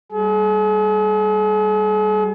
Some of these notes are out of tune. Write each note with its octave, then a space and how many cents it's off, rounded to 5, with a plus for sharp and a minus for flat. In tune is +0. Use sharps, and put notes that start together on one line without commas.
G3 +0 G#4 +45